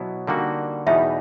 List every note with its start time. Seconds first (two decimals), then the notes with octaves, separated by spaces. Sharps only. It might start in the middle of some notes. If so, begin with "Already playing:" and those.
Already playing: B2 F#3 B3 E4
0.27 D3 G3 A#3 D#4 F#4
0.87 E2 B2 G3 B3 D#4 E5